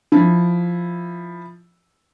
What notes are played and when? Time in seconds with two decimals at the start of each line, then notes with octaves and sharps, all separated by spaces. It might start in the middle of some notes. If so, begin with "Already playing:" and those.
0.12 F3 E4